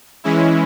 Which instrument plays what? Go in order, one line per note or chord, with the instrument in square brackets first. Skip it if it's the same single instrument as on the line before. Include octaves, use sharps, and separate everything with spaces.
[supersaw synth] E3 G#3 C#4 E4